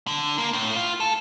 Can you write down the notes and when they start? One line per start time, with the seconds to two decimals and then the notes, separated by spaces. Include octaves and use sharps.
0.07 D3
0.38 A#3
0.53 A2
0.76 F4
1.00 A4